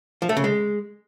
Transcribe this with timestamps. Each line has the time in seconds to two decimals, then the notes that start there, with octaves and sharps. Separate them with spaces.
0.22 F3
0.29 A3
0.37 C#3
0.44 G#3